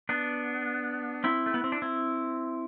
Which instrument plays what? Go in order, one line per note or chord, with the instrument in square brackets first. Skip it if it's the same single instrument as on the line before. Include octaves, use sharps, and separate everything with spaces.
[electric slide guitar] B3 D4
C4 E4
A3
B3
C4
D4
C4 E4